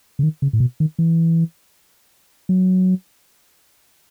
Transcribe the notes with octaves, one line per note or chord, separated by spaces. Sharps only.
C#3
D#3
C#3
A2
B2
D#3
E3
F#3